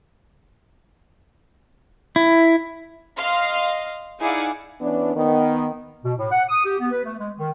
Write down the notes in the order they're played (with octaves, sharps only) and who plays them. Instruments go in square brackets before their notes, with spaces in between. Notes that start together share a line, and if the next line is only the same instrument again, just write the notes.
[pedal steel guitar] E4
[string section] D#5 F5 C6
D#4 E4 G#4 D5 F5 F#5
[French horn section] E3 B3 C#4 D4
D#3 B3
[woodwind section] B2
A2
F#5
D#6
G4
B3
B4
A3
G#3
D#3